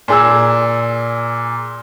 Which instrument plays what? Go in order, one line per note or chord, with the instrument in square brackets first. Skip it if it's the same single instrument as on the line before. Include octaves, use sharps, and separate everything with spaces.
[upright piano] A#2 G#4 E6